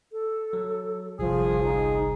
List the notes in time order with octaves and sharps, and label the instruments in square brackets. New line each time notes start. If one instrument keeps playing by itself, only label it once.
[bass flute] A4
[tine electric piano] F#3
[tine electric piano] G1 C2 [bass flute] F3 [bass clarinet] G#4
[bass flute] D#4